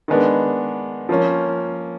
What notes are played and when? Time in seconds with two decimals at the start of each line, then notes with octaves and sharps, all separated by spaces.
0.08 D#3 G#3 B3 D4
1.09 F3 A#3 C#4